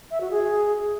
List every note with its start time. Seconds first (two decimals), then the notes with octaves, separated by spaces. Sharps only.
0.11 E5
0.21 F#4
0.31 G#4